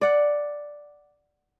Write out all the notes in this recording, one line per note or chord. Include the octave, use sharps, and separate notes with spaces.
D5 F#5